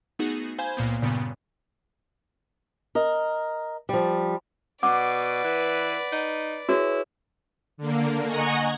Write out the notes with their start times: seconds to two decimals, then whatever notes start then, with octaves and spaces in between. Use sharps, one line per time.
0.19 A3 B3 D#4 F#4 G#4
0.58 C5 F5 G#5 B5 G6 G#6
0.77 C#2 A#2 A#3 B3
1.02 G2 A#2 C#3 G3 B3
2.95 A#4 D#5
3.89 F3 G3
4.83 B2 B4 D5 F#5 D6
5.44 E3
6.12 D#4
6.69 E4 F#4 G#4 B4 C#5
7.78 D3 A#3
8.26 D#5 F#5 G#5 A#5 C#6